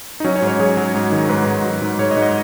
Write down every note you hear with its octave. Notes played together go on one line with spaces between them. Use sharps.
D#4
F#3 C#4
C#5
G#2
C#5
F#3 G#4
F#3
G#2
D#3
G#2 B4
G#2
F#3
G#2
G#2 C#5
D#5
G#2
D#5